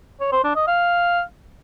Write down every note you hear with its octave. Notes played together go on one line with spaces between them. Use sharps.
C#5
C5
D4
D#5
F5